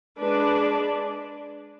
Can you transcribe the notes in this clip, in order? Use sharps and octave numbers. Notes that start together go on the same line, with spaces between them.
G#3 D4 B4 D5